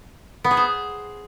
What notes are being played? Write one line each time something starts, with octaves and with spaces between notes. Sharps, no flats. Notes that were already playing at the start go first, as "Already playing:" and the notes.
B3
G#4
C5